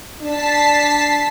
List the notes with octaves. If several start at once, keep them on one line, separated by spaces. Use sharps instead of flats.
D4 A5 B6 C7